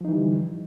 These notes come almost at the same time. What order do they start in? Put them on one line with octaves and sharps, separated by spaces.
F3 D#4 E3 G3 D3